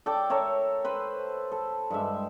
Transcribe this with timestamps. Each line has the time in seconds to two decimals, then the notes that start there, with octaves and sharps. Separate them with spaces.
0.06 A4 D5 G5 D6
0.30 A4 A#4 C#5 E5
0.84 B4 C5 B5
1.52 A4
1.90 G2 G#3 E5